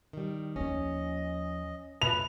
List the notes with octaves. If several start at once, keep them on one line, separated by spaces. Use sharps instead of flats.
D#3 G3
D#2 F3 C#4 D#5
B4 F7